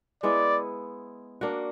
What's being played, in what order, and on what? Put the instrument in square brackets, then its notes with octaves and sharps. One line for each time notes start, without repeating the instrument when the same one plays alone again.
[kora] G#3 B3 E4 [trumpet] D5
[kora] A#3 D4 F#4